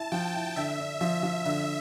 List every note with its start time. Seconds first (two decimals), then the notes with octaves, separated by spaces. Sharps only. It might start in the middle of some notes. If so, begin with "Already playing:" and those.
Already playing: E4 A5
0.12 F3 G5
0.34 E4
0.56 D3 E5
0.78 D4
1.01 F3 E5
1.23 F3
1.45 D3 E5